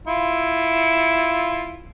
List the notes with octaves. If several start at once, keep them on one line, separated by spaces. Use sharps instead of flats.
E4 F4